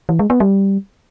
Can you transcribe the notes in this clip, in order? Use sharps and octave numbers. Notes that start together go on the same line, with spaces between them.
E3
G#3
B3
G3